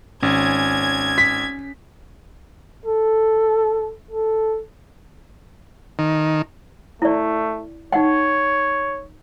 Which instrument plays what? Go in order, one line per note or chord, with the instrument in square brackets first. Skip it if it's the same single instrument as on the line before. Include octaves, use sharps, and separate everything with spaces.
[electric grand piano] G#1 [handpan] C#4 [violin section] G#6
[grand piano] B6
[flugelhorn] A4
A4
[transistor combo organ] D#3
[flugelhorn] A3 [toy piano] E4 D5
[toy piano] D#4 F#5 G5 [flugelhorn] C#5